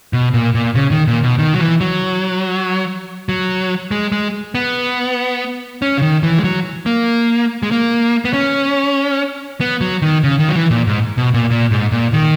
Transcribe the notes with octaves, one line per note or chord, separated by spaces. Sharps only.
B2
A#2
A#2
C#3
D#3
A#2
B2
D#3
F#3
E3
F#3
F#3
G#3
G#3
B3
C#4
C#3
D#3
E3
G#3
F#3
A#3
G#3
A#3
B3
C#4
B3
F#3
D#3
C#3
D#3
F#3
E3
A#2
G#2
B2
A#2
A#2
G#2
A#2
D#3